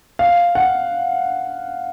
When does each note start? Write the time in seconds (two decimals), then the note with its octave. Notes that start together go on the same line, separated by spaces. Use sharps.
0.19 F5
0.55 F#5